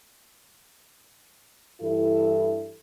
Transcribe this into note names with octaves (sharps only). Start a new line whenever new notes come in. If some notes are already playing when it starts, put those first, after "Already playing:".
G2 E3 E4 A4